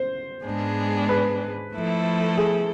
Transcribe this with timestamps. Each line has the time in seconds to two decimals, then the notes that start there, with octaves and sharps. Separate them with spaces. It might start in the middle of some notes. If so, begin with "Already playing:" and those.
Already playing: C5
0.45 G#2 G#3 B3 D4 G#4
1.09 B4
1.74 F3 A3 E4 A4
2.38 G#4